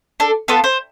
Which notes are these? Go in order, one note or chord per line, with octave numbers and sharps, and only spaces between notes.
D4 A4
B3 F4 A4 B4
C5